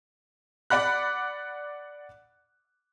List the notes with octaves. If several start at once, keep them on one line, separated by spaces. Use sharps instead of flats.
D5 F#5 B5 F#6